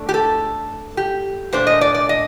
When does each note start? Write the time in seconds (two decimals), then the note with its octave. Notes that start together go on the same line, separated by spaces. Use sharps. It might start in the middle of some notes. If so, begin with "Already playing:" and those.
Already playing: A3 D4
0.09 G4
0.14 A4
0.97 G4
1.53 A#2 A3 D4 C5
1.67 D#5
1.81 D5
1.94 D5
2.09 D#5